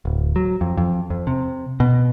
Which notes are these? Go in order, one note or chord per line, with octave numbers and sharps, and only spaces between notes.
D1
F#3
F2
F2
F2
C3
B2